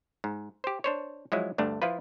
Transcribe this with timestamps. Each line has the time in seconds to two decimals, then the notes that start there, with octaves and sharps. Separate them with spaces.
0.24 G#2
0.64 G4 C5
0.84 D4 C5 C#5
1.32 F3 F#3 G#3 E4
1.58 D2 G2 A3 D4
1.82 F3 E4 F4 B4